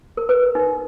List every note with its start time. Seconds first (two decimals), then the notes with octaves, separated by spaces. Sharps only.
0.17 A#4
0.29 B4
0.55 D#4